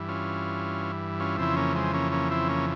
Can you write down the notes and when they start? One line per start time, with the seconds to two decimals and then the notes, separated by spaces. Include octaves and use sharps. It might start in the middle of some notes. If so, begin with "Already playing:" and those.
Already playing: G2 E3
0.08 C#4 F4
1.20 C#4 F4
1.38 F2 C#3 E3 C4 E4
1.56 A#3 C#4
1.75 G#3 C4
1.94 A#3 C#4
2.12 A#3 C#4
2.31 C4 E4
2.49 A#3 C#4